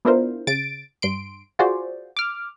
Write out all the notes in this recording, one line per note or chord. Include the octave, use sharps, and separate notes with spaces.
B3 D4 E4 F4 A#4 C5
C#3 A6 D7
G2 C6 D7
F4 F#4 G#4 C5 D5
D6 F6